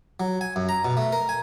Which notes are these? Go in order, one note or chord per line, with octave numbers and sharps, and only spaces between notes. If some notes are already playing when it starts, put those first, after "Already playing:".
F#3
G#5
F#2
A#5
B2
A3
A#4
G#5